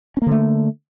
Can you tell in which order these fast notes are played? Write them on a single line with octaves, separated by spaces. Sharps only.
C#4 A#3 D3 A3